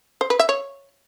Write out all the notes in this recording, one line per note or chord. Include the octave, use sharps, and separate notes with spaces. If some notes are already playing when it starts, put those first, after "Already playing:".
C5
B4
E5
C#5